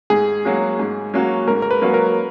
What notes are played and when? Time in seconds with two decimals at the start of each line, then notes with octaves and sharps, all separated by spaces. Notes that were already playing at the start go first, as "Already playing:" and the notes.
0.10 G#2 G#4
0.45 F#3 A#3 C#4 F#4
0.79 G#2
1.14 F#3 A#3 C#4 F#4
1.47 G#2 A#4
1.62 A#4
1.71 B4
1.82 F#3 A#3 C#4 F#4
1.94 A#4